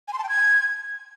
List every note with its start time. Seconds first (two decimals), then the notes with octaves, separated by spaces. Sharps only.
0.08 G#5
0.13 C6
0.18 A5
0.24 G5
0.29 G#6